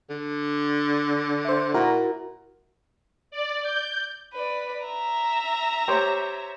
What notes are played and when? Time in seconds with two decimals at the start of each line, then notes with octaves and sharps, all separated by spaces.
0.10 D3
1.45 C5 E5
1.74 A#2 E4 F#4 A#4
3.31 D5
3.63 G6
4.33 B4 D5
4.86 E5 A#5
5.88 G4 C5 C#5